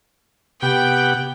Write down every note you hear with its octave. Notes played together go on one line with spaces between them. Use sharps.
C3 B3 G4 F#5 G5